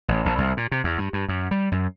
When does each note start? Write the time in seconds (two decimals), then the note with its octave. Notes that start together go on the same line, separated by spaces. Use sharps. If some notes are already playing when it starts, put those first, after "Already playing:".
0.08 A1
0.25 A#1
0.38 C2
0.57 A#2
0.72 C3
0.84 E2
0.98 G2
1.13 G2
1.29 F#2
1.51 G3
1.72 F#2